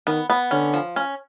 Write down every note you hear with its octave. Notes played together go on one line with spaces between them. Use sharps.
D#3 B3
B3
D3 C#4
F3
C#4